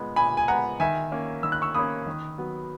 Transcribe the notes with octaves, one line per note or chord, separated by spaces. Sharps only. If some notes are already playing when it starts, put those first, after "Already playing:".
Already playing: A#2 G#3 B3
A#2 G#5 B5
G#5
G#3 B3 F#5 A#5
D#3 E5 G#5
A#3 C#4
D#3 E6
F#6
C#6 E6
A#3 C#4 B5 D#6
D#3
F#3 B3